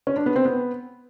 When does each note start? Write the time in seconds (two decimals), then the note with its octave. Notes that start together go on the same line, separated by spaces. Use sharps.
0.07 C#4
0.16 D4
0.26 B3
0.36 C4
0.45 B3